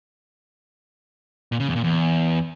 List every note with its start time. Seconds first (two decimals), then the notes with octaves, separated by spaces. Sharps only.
1.52 A#2
1.60 C#3
1.68 E2
1.76 A#2
1.84 E2